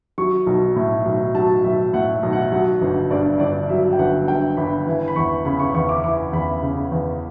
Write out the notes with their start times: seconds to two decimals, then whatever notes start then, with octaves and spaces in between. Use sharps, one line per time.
0.18 F#3 C#6
0.47 B1
0.76 A2
1.05 B1
1.35 F#3 A5
1.64 B1 E5
1.93 A2 F#5
2.13 E5
2.23 B1
2.33 F#5
2.52 F#3 F#5
2.81 G1
3.11 G2 D5
3.40 G1 D5
3.69 F#3 E5
3.93 G5
3.99 G1 F#5
4.28 G2 G5
4.57 G1 B5
4.87 E3
5.08 B5
5.16 E2 C#6
5.45 C#3 B5
5.59 C#6
5.75 E2 C#6
5.89 D6
6.04 E3 D6
6.33 E2 B5
6.63 C#3
6.92 E2